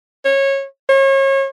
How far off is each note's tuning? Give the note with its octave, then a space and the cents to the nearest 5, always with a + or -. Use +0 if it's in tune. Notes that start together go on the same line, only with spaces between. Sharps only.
C#5 -20
C#5 -35